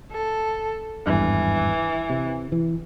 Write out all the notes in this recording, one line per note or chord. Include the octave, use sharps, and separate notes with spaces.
A4
G#1 E2 G2 E3
C3
E3